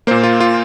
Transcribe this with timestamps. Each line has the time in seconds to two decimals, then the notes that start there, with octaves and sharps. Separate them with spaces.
0.07 A#2 A#3 C5
0.23 F4
0.40 F4